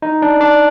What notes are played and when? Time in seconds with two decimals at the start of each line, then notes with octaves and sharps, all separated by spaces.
0.02 D#4
0.22 D4
0.41 D4